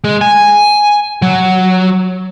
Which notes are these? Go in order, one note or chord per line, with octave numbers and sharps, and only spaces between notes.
G#3
G#5
F#3